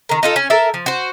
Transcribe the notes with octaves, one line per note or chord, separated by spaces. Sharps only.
D#3 A#4
D#4 F4 A4
C#4
A4 A#4 E5
F3
F#4 C5